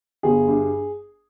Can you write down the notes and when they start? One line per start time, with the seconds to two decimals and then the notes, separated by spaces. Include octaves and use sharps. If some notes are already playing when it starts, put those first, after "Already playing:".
0.23 G1 G#4
0.48 G2